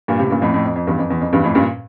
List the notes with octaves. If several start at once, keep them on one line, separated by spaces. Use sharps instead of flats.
G2 A#2
A2 C3
G2 A#2
F2 A2
F2 A2
F2
F2
E2 G2
F2
E2
F2
E2 G2
F2 A2
G2 A#2